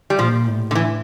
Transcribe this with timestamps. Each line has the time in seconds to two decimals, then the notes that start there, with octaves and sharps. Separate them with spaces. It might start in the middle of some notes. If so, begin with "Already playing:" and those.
0.10 G3
0.19 A#2 F3
0.47 A2
0.71 D3
0.75 E3